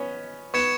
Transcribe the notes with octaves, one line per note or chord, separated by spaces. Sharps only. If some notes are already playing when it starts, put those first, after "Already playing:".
Already playing: B3 C#4
B3 C#6 G#6 C#7 E7